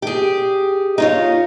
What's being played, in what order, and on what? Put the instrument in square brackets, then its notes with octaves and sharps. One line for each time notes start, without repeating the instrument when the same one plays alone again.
[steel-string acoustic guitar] G4 G#4
D#4 F4 C#5